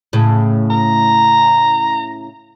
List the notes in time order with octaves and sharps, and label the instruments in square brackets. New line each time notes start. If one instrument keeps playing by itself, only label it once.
[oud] A2 C#3
[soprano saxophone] A#5